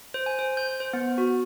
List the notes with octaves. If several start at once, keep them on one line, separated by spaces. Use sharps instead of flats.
C5
G#5
C5
G6
C5
B3
F#4